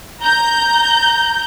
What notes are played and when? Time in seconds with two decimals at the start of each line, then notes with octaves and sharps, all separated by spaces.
0.22 A#5 G6